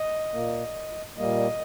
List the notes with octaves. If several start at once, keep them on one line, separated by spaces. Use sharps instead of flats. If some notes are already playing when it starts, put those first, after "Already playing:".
Already playing: D#5
A#2 A#3
A#2 G3 A#3 D#5